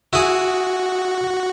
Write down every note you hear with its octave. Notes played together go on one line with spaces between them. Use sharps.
E4 F#4 G#4